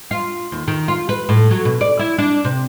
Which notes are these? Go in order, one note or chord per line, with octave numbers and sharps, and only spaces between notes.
F4
D#2
D#3
F4
B4
A2
F#3
B2
D5
E4
D4
C3